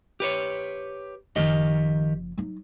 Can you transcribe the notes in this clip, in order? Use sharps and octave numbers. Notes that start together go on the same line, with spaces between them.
G4 B4 C#5
F#1 D#3 F3 G4 D#5
F#3 D#4